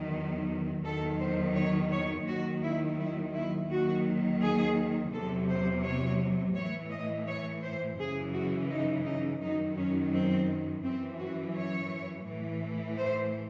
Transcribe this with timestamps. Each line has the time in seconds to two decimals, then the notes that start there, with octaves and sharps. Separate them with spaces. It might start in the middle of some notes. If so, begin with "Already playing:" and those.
Already playing: E2 D#3 F#3
0.85 E2 D#3 F#3 A4
1.20 C5
1.56 C#5
1.91 C#5
2.27 D#2 D#3 F#3 F#4
2.63 E4
2.98 E4
3.34 E4
3.70 D#2 D#3 F#3 F#4
4.41 G#4
5.13 E2 C3 F#3 A4
5.49 C5
5.84 C#5
6.55 A2 E3 C#5
6.91 D#5
7.27 C#5
7.63 C5
7.99 F#2 C#3 E3 G#4
8.34 F#4
8.69 D#4
9.06 D#4
9.41 F#2 D#3 F#3 D#4
9.77 C#4
10.12 C4
10.84 F#2 E3 C4
11.19 F#4
11.56 C#5
12.28 A2 E3
12.99 C5